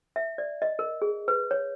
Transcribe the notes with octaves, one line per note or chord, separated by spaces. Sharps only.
E5
D5
D#5
A#4
G#4
B4
C#5